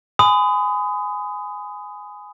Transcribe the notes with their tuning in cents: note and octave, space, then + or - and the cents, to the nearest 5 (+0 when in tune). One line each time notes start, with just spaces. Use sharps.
G#5 +0 B5 +40 D#6 +0